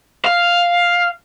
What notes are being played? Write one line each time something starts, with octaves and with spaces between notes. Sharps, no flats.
F5